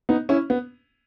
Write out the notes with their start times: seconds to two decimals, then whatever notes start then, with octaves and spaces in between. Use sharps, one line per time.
0.09 B3 D#4
0.29 C#4 E4
0.50 B3